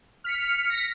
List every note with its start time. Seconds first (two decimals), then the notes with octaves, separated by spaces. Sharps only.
0.24 F6 B6 C#7
0.70 A#6 B6